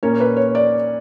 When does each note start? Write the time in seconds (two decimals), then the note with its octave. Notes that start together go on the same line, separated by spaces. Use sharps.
0.03 A#2 A#3 C#4 C#5
0.20 B4
0.36 C#5
0.55 D5